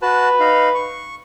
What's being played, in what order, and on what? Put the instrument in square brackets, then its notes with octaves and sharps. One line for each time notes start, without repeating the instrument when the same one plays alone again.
[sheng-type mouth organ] F#4 A5 [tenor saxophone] B4
[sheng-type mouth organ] D#4 F5
C#6